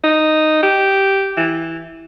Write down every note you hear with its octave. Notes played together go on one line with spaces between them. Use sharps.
D#4
G4
E3